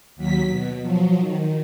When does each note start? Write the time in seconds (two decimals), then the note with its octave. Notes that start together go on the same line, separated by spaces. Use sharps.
0.16 D#2 F#3 B6
0.49 B2
0.82 F3 F#3
1.19 D#3